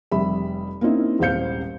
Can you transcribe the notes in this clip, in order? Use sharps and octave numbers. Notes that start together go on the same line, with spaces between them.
F1 G3 E5 B5
A#3 C4 C#4 D#4 E4
D#1 G#1 C5 F5 G6 C#7